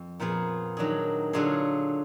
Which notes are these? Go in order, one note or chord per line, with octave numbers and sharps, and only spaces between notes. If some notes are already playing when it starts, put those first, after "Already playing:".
Already playing: F2
A#2 F3 B3 F4 G#4
D#3 F#3 D4 G#4
D3 F#3 D4 F4 G#4